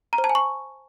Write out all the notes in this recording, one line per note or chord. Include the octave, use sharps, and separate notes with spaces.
A#5
C5
A5
G#5
C#6